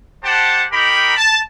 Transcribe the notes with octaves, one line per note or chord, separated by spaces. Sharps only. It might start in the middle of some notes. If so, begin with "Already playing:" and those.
G4 C5 F#5 A5
D#4 G4 A#4 G5 B5
A5